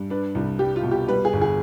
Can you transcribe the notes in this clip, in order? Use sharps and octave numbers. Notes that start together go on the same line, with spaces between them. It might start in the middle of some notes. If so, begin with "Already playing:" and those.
Already playing: G2
D4 B4
C2
G3 G4
F4
B2
G4
G3 B4
G#4
G1
G#4